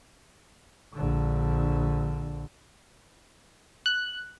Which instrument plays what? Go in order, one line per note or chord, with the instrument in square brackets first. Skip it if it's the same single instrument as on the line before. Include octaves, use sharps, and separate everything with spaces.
[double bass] A#1 D3
[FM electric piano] F#6